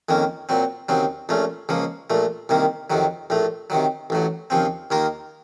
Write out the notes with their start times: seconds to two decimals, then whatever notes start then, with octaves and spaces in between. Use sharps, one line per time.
0.09 F2 D#3 A#3 C#4
0.49 A#2 F#3 C4
0.89 D#2 C#3 F#3 C4
1.29 A#1 A#2 A3 C#4
1.69 C#2 C#3 F3 A#3
2.10 A#1 A#2 A3
2.49 C2 C3 D#3 A#3
2.90 F2 C3 D#3 F#3
3.30 A#1 A2 A3
3.70 C3 D#3 F#3
4.10 A1 A2 F#3
4.50 D#2 C#3 F3 C4
4.91 D#2 D#3 A#3 F4 A#4